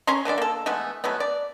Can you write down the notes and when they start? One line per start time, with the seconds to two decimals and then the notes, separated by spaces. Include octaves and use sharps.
0.07 C#4 G#5 A#5 C6
0.25 D3 E3 G#3 D5
0.38 A#3 A4
0.66 E3 G#3 A3 B3
1.04 F#3 G#3 A3 B3
1.20 D5